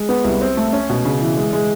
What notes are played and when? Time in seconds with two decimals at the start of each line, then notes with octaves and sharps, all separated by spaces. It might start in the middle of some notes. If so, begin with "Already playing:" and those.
Already playing: G#3
0.09 B3
0.24 C2
0.41 C4
0.57 A3
0.73 C#4
0.90 B2
1.05 C#3
1.21 E3
1.37 G#3
1.53 G#3